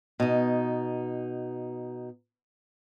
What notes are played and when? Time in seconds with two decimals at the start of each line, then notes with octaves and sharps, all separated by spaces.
0.20 B2 D#4